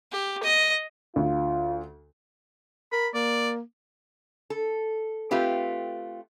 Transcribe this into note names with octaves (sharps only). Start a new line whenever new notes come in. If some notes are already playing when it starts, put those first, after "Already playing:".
G4
D#5
D2 F4
A#4 B5
A#3 D5
A4
A3 C4 F4 G4 B4